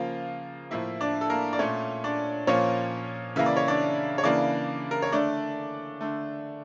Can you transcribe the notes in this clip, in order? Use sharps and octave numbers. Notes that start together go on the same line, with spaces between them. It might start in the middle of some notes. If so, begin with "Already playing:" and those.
Already playing: C#3 F3 A#3 F4 F5
A2 F3 A#3 E4 E5
D4 D5
A4
A#3 A#4
D5
A#2 A3 C#4 C#5
D4 D5
A#2 F3 A#3 C#4 C#5
C#3 E3 A#3 E5
D5
C#5
D4 D5
C#5
C#3 E3 A#3 D4 D5
A#4
C#5
D3 A3 D4 D5
D3 A3